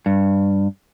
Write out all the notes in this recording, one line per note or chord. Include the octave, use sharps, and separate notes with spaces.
G2